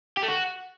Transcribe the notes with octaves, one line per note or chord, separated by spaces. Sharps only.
G4
A3
F#4